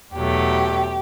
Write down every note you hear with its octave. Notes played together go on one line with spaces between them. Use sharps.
E2 B2 F#3 A3 G4